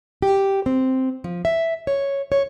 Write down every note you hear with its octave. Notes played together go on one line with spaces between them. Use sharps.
G4
C4
F3
E5
C#5
C#5